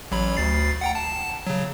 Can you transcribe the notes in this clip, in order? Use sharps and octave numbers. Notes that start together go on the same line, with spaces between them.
A1 F#3 B5
D2 A6 C7
F#5 G5 A#5
A5
C#3 F#3